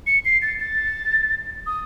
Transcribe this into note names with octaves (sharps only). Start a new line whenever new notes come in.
C#7
C7
A6
A6
D#6